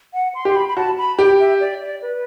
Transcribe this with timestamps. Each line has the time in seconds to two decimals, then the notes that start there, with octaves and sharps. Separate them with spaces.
0.14 F#5
0.35 C6
0.45 G4 C6
0.56 B5
0.69 B5
0.77 F#4 A5
0.98 B5
1.18 G4 G5
1.40 E5
1.60 D5
1.81 D5
2.02 B4